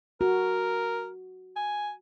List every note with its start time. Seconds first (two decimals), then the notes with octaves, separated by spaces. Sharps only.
0.21 F#4 A#4
1.56 G#5